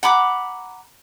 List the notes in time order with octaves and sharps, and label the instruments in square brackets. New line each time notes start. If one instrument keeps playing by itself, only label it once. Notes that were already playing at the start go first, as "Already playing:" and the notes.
[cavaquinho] F#5 A#5 B5 D6